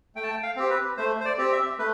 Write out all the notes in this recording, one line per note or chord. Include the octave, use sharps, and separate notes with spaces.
A3 G5
A5
G5
F5
C4 G4
B4
A3 C5
C5
D5
C4 G4
E5
A3 B4